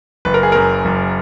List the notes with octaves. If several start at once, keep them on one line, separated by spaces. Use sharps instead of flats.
F#1 B4
A#4
G#4
F#2 A#4
F#1